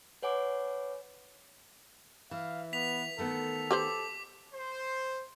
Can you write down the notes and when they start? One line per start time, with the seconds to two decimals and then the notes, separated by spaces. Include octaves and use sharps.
0.23 B4 C#5 F#5 G#5 D6
2.31 E3 F5
2.73 B3 B6 F7
3.18 D#3 A3 B3 A4
3.71 G4 B4 C5 D6
4.54 C5